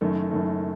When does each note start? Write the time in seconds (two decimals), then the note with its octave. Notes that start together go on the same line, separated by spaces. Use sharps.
0.01 F#1 F#2 D#3 A3
0.31 F#1 F#2 D#3 A3